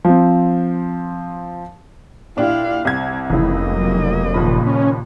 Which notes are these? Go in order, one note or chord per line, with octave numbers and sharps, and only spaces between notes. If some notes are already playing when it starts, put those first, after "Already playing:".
F3 C4
A#2 D4 E4 G4 F5
C2 G3 C4 G#6
F1 C#2 E3 A#3 E4 D#5
F#3
D#2 A#2 C#3 F3 B5
C#4